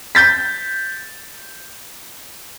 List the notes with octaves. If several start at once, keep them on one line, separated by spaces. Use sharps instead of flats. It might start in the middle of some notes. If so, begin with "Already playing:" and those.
G6 A6 B6